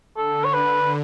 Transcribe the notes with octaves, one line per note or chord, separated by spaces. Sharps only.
D3 A4
C#5
B4